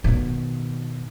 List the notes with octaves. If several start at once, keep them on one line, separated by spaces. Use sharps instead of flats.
B2 D#3